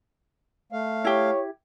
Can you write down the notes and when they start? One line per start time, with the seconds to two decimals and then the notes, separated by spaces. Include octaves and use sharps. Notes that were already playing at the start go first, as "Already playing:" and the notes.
0.72 A3 F5
1.05 E4 G4 C#5